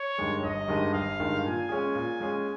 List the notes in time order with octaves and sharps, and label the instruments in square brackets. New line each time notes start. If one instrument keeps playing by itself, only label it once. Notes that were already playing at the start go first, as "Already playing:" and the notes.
Already playing: [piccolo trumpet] C#5
[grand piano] G2 D#3 G#3
[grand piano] G1 [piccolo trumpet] D#5
[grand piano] G2 D#3 G#3
[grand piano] G1 [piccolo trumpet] F5
[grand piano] G2 D#3 G#3
[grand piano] A#2 [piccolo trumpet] G#5
[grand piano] G#3 C#4 G#4
A#2
G#3 C#4 G#4